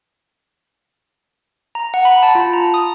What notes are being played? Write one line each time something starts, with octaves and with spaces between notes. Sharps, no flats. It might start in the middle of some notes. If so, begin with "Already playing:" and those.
A#5
F#5
B5
A5
F4
A#5
D#6